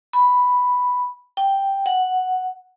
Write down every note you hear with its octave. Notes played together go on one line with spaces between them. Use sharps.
B5
G5
F#5